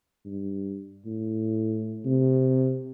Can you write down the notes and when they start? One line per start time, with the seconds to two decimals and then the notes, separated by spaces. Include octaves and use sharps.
0.25 G2
1.06 A2
2.05 C3